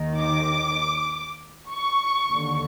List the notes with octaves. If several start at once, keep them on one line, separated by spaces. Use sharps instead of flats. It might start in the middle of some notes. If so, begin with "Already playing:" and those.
Already playing: D#2 D#3
D6
C#6
D#2 D3